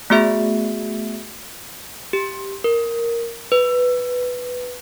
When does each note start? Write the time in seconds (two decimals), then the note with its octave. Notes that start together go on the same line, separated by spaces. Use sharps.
0.10 A3 B3 F#4 G#4 E5
2.13 G4
2.64 A#4
3.52 B4